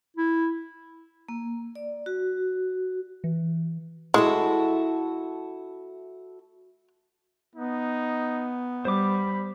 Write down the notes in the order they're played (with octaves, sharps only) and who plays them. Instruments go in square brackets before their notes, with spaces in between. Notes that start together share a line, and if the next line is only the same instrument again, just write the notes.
[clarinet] E4
[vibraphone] A#3
D5
F#4
[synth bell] E3
[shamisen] G#3 [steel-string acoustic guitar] E4 F#4 A4
[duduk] B3 [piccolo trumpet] D#4
[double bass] G3 [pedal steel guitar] C5 D6 [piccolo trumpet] B5